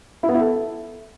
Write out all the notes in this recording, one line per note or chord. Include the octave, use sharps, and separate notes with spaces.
E4
B3
E4
A4